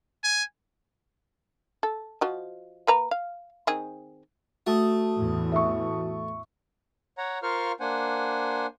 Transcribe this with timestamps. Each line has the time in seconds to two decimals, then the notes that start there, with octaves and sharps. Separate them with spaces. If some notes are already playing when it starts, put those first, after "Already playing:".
0.24 G#5
1.83 A4
2.21 F3 F#4 D#5
2.87 A#3 B4 A#5
3.11 F5
3.67 D#3 C4 G#4
4.67 A3 F#4 A5 D#6
5.15 E2 A2 E3
5.52 E5 C#6
7.18 C#5 F#5 A#5
7.43 F4 A#4 C5 F5 C#6 F6
7.80 A#3 D4 C5 F#5 G#5